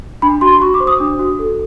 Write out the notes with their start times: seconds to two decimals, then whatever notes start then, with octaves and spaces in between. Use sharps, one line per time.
0.22 D4 B5
0.41 F#4 C6
0.61 F#4 C#6
0.74 D6
0.80 C5
0.87 D#6
1.00 D4
1.19 F#4
1.39 A4